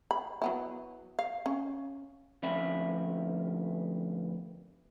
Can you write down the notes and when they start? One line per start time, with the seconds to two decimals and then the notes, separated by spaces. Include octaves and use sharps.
0.11 B5
0.42 F#3 B3 E4
1.19 F5
1.46 C#4
2.43 D2 F3 C4 C#4 E5 B5